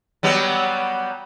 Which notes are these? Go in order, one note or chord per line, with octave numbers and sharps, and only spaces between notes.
F#3 G3 B3